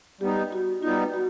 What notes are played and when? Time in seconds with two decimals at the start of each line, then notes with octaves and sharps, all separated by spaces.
0.21 G3 B3 D#4 G4
0.52 F#4
0.82 G3 B3 D#4 F4
1.14 F#4